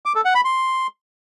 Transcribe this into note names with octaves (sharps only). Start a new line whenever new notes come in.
D6
A4
F#5
B5
C6